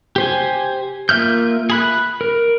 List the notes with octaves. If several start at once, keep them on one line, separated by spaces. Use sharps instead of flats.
G4 C5 G#5
A#3 F4 E5 F6 G6
G#4 B5 F#6
A#4